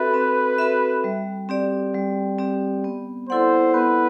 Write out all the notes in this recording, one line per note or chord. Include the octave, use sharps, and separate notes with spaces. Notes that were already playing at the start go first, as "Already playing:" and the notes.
Already playing: C4 F#4 A4 B4 E5
C4
F#4 A4 E5
G3
C4 G4 D5
G3
C4 G4 D5
B3
E4 A4 C5 D5 F#5
B3 B4